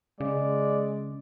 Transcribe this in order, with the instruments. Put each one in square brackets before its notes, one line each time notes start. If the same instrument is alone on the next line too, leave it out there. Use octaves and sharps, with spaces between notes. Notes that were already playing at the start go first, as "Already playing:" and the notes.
[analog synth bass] C#3 [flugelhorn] G#3 [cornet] D5